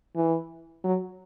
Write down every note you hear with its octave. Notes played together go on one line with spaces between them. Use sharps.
E3
F#3